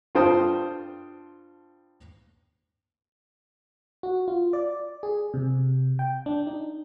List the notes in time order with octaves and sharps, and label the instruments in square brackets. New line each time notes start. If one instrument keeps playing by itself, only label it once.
[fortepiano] G2 F4 A4 C5 G5 D#6
[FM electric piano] F#4
F4
D5
G#4
C3
G5
D4
D#4